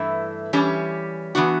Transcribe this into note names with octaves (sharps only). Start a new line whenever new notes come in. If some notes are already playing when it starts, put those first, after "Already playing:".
Already playing: G2 E3 A3 E4
E3 G3 C#4 G4
E3 B3 D4 F#4